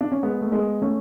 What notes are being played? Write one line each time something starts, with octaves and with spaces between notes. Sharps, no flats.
D4
C#4
G#3 B3
A3
G#3 B3
A3 C#4